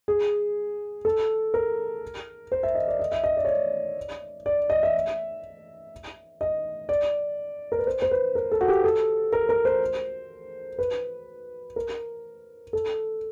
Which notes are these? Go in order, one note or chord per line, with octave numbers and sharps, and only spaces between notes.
G#4
A4
A#4
C5
E5
D#5
D5
D#5
E5
D#5
D5
C#5
D5
D5
D#5
E5
D#5
D5
A#4
B4
C5
C5
B4
A#4
A4
F#4
G4
A4
A#4
A#4
C5
B4
A#4
A4